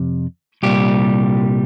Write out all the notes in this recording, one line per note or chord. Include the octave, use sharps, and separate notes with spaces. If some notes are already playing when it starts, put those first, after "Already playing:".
Already playing: F2 C3
C2 A#2 G3 G4